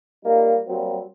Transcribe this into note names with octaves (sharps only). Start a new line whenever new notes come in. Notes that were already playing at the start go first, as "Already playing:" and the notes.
G3 A#3 D#4 F4
F#3 G3 A#3 C4